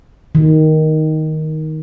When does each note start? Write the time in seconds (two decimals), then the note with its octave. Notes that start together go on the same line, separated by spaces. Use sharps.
0.35 D#3